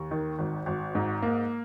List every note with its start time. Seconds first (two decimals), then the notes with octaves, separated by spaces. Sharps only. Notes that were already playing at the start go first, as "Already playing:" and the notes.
Already playing: D#2
0.11 D#3
0.39 G#1
0.66 G#1
0.95 G#2
1.22 A#3